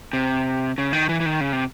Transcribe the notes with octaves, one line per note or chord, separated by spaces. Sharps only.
C3
C#3
D#3
E3
E3
D#3
C#3
C3